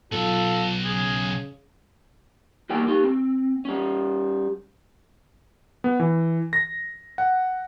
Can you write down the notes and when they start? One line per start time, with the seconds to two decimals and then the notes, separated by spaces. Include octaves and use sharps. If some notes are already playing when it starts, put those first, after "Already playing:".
0.12 B1 F4 A4
0.85 C#3 G#4
2.69 E2 D#3 G3 A#3 G5
2.88 D#4 G4
3.03 C4
3.65 G3 C#4
5.84 B3
6.00 E3
6.53 A#6
7.18 F#5